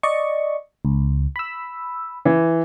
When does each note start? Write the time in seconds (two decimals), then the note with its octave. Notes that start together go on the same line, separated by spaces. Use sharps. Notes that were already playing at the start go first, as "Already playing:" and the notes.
0.03 D5 D#5 C#6
0.85 C#2
1.36 B5 E6
2.25 E3